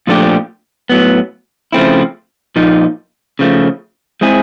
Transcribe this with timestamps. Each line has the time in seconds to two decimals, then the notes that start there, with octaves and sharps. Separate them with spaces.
0.07 A#2 F3 A3 D4 G4
0.90 A2 F#3 B3
1.73 C#3 F3 A3 C4 E4
2.56 A#2 F3 A#3 D#4
3.39 C#3 F3 A3
4.21 G#3 C4 E4 G#4